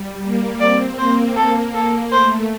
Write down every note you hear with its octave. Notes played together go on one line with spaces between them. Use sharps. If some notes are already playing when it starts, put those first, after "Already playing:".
Already playing: G3
A#3
C4 D5
A#3 C5
A#3 A4
A4
A3 C5